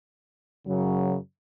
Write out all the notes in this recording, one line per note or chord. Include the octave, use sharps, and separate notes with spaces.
F#2 C#3 F#3